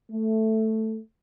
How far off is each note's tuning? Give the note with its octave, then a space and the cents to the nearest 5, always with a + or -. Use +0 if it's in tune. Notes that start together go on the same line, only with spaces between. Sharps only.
A3 +0